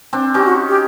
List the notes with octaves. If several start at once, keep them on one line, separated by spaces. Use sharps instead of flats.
C4 D4
C#4 D#4 G4
F#4
G4